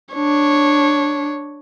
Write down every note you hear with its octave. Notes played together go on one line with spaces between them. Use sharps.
D4 C#5